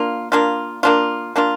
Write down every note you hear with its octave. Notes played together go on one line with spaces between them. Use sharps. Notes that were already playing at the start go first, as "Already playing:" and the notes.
Already playing: A#3 D4 F4
A#3 D4 F4
A#3 D4 F4
A#3 D4 F4